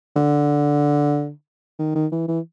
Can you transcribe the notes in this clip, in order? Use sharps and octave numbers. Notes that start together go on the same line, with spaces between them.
D3
D#3
D#3
E3
E3